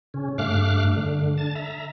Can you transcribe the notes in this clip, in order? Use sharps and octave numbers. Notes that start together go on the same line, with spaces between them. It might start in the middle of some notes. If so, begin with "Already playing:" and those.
C#3 C#4
G2 A3 F5 D6 F6 F#6
D3
A5 A6
E5 A#5